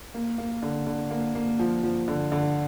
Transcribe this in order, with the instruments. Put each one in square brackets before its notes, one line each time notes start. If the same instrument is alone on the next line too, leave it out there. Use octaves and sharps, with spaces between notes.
[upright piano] A#3
A#3
D3
D3
A#3
A#3
F3
F3
D3
D3